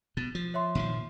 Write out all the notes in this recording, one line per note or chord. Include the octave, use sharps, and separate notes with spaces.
B2 A6
F3
C#5 E5 C6
A#2 D#3 F3